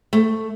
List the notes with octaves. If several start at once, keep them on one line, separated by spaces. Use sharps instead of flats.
A3